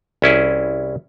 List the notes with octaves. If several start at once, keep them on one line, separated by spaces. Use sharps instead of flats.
C2 C#4 E4 G#4